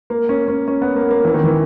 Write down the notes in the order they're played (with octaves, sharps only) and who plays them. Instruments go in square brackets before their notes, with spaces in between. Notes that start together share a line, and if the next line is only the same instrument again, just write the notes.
[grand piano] A#3
C#4
C#4
C#4
B3
A#3
A#3
E3
D#3
E3